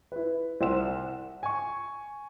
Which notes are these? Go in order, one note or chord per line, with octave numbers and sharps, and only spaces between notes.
E4 B4
C2 C5 F#5 C6 E6 E7
F#5
G#5 C#6